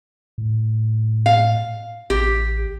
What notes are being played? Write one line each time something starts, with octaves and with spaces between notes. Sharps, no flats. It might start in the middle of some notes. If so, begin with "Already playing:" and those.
A2
F5
A1 G4